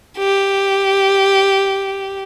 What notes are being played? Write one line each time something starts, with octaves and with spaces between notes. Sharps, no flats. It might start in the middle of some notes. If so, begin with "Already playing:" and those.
G4